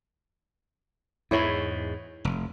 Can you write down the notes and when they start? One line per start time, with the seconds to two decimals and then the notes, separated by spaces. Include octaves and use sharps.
1.31 E2 G#2 E4 C#5
2.25 F1